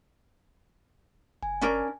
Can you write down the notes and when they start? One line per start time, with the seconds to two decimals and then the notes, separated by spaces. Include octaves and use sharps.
1.43 F#1 G#5
1.61 C#4 D4 A#4